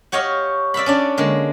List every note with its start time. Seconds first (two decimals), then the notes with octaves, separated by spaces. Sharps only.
0.12 F#4 G4 C#5 D#5 F5
0.74 D5 E5 F5 B5
0.86 C#4 D4 D5
1.17 D3 G#3 A#3